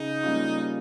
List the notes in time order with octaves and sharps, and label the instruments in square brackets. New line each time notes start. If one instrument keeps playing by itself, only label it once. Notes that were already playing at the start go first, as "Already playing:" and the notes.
Already playing: [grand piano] C#3 [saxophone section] D#4
[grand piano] G3 A#3 C#4 F4